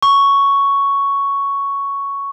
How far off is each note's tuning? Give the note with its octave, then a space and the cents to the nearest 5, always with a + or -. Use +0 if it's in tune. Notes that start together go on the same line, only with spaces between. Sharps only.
C#6 +5